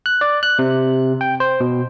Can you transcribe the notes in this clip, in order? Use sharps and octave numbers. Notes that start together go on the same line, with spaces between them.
F#6
D5
F#6
C3
G5
C5
B2